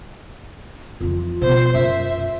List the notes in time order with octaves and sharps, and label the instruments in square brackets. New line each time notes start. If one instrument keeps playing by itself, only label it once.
[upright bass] F2 E3 [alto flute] F4
[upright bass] B2 B3 [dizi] C5
[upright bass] F#2 [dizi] E5